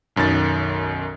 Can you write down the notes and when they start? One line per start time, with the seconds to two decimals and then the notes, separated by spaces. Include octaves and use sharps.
0.16 B1 F#2 D#3 A6